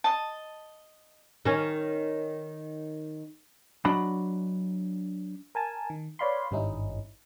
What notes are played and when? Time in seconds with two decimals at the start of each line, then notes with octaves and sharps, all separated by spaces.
0.04 D#5 A5
1.45 D#3 C#4
3.85 F#3 D4 D#5 F#5 B5
5.55 A#4 G#5 A5
5.90 D#3
6.19 B4 C#5 D5 F5 B5 C6
6.51 G#1 G2 G3 C#4 D#4 E4